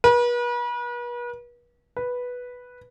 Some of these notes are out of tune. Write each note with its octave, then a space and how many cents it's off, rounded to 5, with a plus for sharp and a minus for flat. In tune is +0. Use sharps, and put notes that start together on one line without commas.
B4 -40
B4 -5